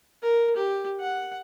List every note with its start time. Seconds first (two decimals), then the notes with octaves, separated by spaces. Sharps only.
0.22 A#4
0.57 G4
1.01 F#5